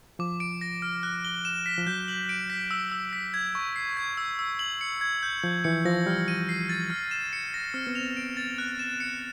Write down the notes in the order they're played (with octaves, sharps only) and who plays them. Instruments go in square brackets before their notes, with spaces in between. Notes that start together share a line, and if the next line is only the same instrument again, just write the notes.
[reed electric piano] F3 [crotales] D6
[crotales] D7
A#6
F6
F#6
G7
E7
B6
[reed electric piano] F3
[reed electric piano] F#3 [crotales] G6
[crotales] F#7
D7
B6
E6
E6
B6
G#6
C#6
C7
G#6
E6
E6
F#7
C#7
G#6
G6
[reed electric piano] F3 [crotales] G6
[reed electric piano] E3 [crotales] C#7
[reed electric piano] F3 [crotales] A#6
[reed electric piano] G3 [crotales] F6
[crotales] D#7
C7
A6
F6
E7
C#7
A#6
[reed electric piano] C4 [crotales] F6
[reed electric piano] B3
[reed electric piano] C4 [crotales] F7
[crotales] D7
A6
F#6
E7
C#7